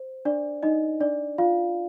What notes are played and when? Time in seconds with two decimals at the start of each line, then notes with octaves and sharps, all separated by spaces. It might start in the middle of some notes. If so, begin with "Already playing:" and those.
Already playing: C5
0.25 D4 D5
0.63 D#4 D#5
1.00 D4 D5
1.38 F4 F5